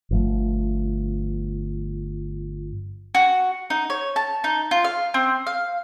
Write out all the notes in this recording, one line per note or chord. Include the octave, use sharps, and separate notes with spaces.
G1 F3 A3
F#4
D#4
C#5
A5
D#4
F4
F5
C4
F5